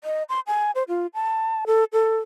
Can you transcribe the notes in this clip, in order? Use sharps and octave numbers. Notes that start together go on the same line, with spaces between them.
D#5
C6
G#5
C5
F4
A5
A4
A4